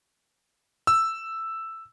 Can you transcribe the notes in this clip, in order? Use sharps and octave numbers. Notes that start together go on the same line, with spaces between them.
E6